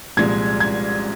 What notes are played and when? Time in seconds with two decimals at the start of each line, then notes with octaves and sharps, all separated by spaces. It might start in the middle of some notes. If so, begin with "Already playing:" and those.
0.17 C2 A#2 F3 G#3 G#6
0.60 G#6